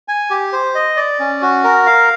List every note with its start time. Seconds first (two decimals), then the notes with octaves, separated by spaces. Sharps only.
0.08 G#5
0.30 G4
0.53 C5
0.75 D#5
0.97 D5
1.19 C#4
1.42 F#4
1.64 A#4
1.86 F5